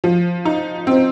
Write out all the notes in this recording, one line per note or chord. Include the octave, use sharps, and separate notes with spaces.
F3
D#4
C4